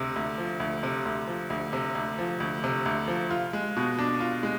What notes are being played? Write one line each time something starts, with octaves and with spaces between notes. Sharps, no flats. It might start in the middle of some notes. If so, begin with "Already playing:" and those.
Already playing: D2 C3
D2
F3
D2
C3
D2
F3
D2
C3
D2
F3
D2
C3
D2
F3
F4
G#3
B2
D4
F4
G#3